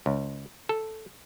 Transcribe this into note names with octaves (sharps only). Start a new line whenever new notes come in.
C#2
A4